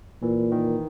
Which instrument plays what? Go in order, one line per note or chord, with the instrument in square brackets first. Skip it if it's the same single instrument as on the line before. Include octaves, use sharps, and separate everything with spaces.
[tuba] A#2 [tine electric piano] E3
[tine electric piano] D#3